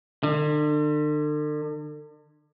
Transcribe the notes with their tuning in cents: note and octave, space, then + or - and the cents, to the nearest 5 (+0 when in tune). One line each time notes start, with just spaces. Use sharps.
D3 +40